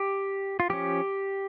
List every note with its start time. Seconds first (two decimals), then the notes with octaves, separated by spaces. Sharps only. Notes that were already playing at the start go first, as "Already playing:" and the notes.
Already playing: G4
0.60 F4
0.70 F3 C#4 G4